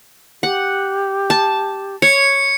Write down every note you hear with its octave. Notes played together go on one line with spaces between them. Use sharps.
G4 F#5
A5
C#5 C#7